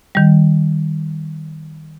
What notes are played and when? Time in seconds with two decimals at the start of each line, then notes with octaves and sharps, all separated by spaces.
0.15 D#3 G3